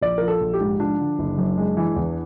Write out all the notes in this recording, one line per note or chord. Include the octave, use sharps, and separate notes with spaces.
A#1 D5
F3 A#4
A4
A#1
G4
G#2
F3 D4
D3
F#1
F#2
G#3
E3
E2